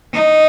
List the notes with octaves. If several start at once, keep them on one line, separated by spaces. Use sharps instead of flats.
D#4